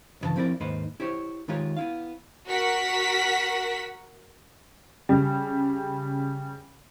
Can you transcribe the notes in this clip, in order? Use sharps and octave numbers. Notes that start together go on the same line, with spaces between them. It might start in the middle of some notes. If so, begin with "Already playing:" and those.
B1 G2 C#3 E3 A5
F3 C4 E4 A#4 D5
D#2 G#2 A#3 D#4 B4 C5
E4 G4 C5 C#5
D#3 G#3 D#4 F4 G4 C#5
B3 E4 F5
F#4 A#4 F#5 B6
C#3 G3